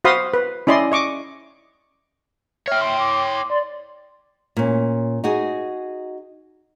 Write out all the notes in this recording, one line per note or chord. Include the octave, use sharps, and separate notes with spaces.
F#4 C5 F5 B5 C6 D#6
B4
C#4 E4 D5 D#5 C6
D#5 C#6 D6
C#5 E5 G5 F6
C6
D6
D6
D5 C6
A#2 C#4
D#4 F#4 G#4